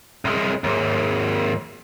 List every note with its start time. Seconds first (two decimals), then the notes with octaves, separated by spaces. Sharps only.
0.25 C2 G#3
0.64 D#2 G#2